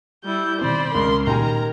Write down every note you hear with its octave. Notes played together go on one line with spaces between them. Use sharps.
G3 E4 G6
B2 D#3 C4 C5 D5 B5
C#2 C#3 A#4 C6
A#2 D#3 G3 A#4 G#5 A#5